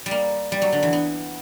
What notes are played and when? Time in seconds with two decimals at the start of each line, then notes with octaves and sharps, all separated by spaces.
0.06 G3
0.11 A#3
0.52 G3
0.62 F#3
0.72 D3
0.83 E3
0.93 B3